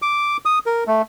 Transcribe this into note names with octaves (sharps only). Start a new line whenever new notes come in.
D6
D#6
A#4
A3